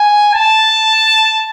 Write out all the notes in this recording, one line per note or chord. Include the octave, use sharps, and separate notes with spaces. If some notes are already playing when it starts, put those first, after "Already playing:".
Already playing: G#5
A5